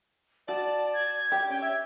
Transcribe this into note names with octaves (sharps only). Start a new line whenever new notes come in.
F#4 D5 A5
G#6
G4
C#4 G5
E5 G#6